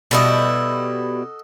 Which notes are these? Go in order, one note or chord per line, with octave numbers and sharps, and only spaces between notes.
B2 G3 E4 F#4 A4 D#5